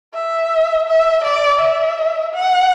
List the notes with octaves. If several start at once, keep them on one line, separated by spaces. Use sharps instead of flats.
E5
E5
D5
E5
F#5